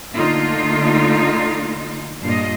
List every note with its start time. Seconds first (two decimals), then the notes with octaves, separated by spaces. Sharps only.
0.16 D3 A3 A#3 D#4 F4
2.23 G2 A#2 F4 D#5